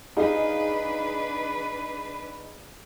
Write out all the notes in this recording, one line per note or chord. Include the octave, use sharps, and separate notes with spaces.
D4 D#4 G#4 B4 F5